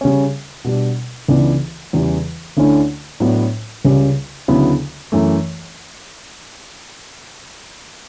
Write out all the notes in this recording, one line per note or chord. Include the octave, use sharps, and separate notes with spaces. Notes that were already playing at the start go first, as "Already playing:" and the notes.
C#3 G3 C#4
B2 G3 D4
C#2 C#3 E3 B3 D4
E2 C#3 E3 G3
D2 D3 A3 C#4 E4
A2 F#3 B3 D4
C#2 C#3 G3 C#4
D2 C#3 F#3 B3 E4
F#2 E3 A3